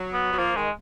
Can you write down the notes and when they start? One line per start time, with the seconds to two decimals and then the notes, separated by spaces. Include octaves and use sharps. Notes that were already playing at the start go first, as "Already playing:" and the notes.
Already playing: F#3
0.13 B3
0.32 F#3
0.38 F3 A#3
0.55 D#3 G#3